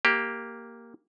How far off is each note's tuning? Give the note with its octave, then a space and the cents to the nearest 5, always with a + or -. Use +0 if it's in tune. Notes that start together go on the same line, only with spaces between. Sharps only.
A#3 +0 G4 +0